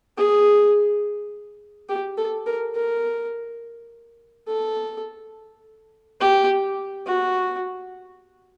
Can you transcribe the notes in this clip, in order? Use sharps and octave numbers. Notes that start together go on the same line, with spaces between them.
G#4
G4
A4
A#4
A#4
A4
G4
F#4